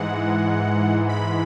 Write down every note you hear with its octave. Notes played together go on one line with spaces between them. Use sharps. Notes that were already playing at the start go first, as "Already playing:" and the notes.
Already playing: G#2 E3 G#3 F#5
B5